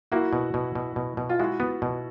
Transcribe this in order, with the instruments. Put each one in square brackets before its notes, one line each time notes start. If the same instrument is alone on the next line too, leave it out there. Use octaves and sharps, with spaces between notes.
[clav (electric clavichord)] A#3 [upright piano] E4 F#4
[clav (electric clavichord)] B2
B2
B2
B2
B2
[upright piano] F4
[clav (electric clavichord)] G#3 [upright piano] E4 F#4
[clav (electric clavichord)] B3
B2